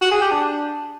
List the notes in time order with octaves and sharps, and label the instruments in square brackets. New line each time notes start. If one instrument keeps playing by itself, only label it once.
[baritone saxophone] F#4
G#4
G4
D4